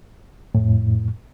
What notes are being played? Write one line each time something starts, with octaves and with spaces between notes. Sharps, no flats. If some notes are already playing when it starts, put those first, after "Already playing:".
F2 A2